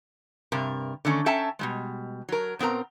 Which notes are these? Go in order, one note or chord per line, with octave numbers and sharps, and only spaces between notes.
G2 C3 A#4
D3 D#3 A3 C#4
C#4 A4 E5 G5 A5 A#5
B2 G3 G#3
F#3 A#4
A#2 B3 C4 A#4 A#5